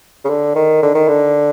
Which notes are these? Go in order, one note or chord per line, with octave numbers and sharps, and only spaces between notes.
C#3
D3
D#3
D3
D#3
D3